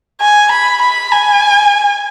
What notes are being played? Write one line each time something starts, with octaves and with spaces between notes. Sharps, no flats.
G#5
B5
B5
G#5